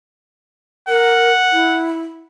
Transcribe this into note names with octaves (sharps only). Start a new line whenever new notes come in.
A#4 F#5
E4